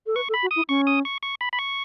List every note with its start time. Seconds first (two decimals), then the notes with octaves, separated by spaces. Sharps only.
0.06 A4
0.16 B4 C#6
0.29 A4
0.34 B5
0.43 F#4
0.51 D#6
0.56 E4
0.69 C#4 C#6
0.87 D#6
1.05 C#6
1.23 C#6
1.41 B5
1.53 B5
1.59 C#6